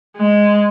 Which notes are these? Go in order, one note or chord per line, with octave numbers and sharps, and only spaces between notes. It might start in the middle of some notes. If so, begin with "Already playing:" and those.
G#3